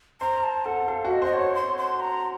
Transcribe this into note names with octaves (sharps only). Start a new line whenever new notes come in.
C5 A#5
A5
A4 F#5
A4 F5
F#4
D#5
C5 D#5
C#5
C6
C6
A#5